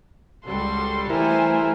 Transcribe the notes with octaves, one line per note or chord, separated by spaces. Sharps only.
C#2 G3 F#4 A4 C6
E3 A3 E4 A#4 C5 G#5